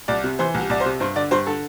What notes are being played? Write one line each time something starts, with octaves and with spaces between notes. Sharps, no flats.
C2 D5
C3
E3 C5
C2
G4
C2 D5
C5
C3
G2 C5
D3 D5
G2 C5
D3 A4